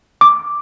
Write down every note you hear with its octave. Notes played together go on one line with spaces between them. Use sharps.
D6